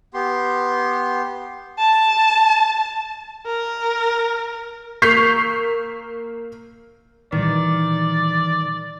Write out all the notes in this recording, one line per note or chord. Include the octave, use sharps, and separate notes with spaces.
B3 G4 C6
A5
A#4
A#3 C#6 G6 B6 C7 F7
A#1 D#3 E3 G3 D5